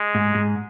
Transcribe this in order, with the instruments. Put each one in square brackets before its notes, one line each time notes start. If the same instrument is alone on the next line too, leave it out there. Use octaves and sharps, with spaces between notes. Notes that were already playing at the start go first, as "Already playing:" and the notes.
Already playing: [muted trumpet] G#3
[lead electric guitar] G#2
G#2